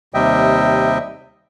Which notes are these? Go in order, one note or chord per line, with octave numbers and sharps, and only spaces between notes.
D#2 C3 G3 D#5 E5 G5